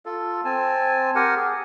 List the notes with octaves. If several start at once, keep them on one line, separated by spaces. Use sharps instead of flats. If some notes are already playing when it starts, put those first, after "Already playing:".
F4 A4
C4 G#5 A5
G4 A#4 F#5 G#5
G#4